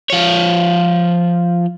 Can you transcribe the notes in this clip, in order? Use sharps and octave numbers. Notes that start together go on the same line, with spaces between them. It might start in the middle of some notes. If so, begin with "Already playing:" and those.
F3 C#5